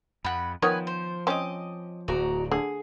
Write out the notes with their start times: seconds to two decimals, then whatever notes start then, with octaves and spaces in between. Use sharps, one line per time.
0.25 F2 F#5 B5
0.62 D#3 F3 B3 B4 C#5 G#5
0.87 C5
1.27 C4 C#4 D#5 D6
2.08 D1 D2 F#4 D5 A#5
2.51 D3 G#4